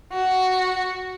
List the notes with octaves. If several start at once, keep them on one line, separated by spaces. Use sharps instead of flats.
F#4